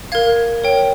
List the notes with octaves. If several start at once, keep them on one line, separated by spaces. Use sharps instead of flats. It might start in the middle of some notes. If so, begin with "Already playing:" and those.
A#4 F5 G#6
A#4 C#5 G5